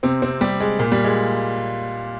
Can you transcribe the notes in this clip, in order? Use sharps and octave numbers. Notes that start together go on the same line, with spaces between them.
C3 C4
C3 C4
G3 G4
G#3
A#2 A#3
G3
G#3